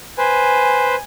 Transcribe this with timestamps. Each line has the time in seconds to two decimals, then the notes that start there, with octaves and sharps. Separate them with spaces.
0.18 B4 C5 G#5